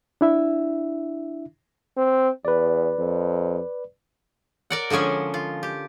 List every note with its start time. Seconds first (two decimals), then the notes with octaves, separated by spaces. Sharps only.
0.21 D4 E4 E5
1.97 C4
2.45 E2 B4 D5
2.99 F2
4.70 A#4 D5 F#5
4.90 D3 F3 G#3 C#4 G#4
5.34 F4
5.63 G4